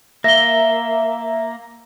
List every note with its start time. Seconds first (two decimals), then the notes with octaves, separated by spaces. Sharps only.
0.24 A#3 E5 A#6 G7